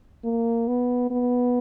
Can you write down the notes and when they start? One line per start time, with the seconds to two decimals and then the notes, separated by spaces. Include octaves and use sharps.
0.24 A#3
0.68 B3
1.11 B3